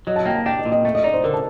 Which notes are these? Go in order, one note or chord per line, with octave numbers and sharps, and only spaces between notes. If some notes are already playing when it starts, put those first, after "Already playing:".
F#3 D#5
A5
A#3 G5
A5
D4 G5
D#5
A#2
D#5
A3
D#5
D#4 D5
C5
D3 A#4
A5